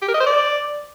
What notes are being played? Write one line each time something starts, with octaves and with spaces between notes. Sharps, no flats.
G4
A#4
D#5
C5
D5